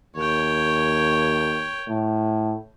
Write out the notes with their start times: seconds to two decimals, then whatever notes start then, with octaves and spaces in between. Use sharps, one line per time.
0.16 D#2 C#5 G5
1.87 A2